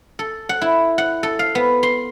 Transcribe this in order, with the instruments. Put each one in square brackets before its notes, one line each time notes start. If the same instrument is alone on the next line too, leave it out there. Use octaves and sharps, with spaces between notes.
[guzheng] A4
F#5
E4
F#5
A4
F5
B3
C6